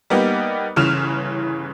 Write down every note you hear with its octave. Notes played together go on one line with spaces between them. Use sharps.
G3 A#3 B3 D#4 G4
G1 C#3 E3 F6 E7 F7